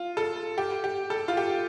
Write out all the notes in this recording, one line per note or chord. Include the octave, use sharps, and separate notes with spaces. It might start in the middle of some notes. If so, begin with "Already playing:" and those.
Already playing: F4
A4
G4
G4
A4
F4
G4